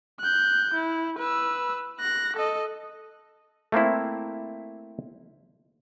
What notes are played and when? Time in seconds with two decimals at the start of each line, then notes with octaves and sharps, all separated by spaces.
0.20 F#6 G6
0.74 E4
1.19 B4 E6
2.00 F#6 A#6
2.36 A4 D#5
3.72 A3 A#3 C4 E4